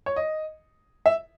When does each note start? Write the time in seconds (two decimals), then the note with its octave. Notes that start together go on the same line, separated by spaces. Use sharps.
0.06 C#5
0.16 D#5
1.06 E5